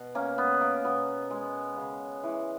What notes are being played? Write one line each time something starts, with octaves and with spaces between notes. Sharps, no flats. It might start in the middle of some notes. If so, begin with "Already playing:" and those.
Already playing: B2
A#3 C#4
G#3 B3
A#3
B2 B3
G#3
C#3
E3 G#3